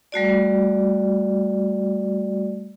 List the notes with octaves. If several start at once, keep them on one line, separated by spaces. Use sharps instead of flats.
G3 A3 F#4 D5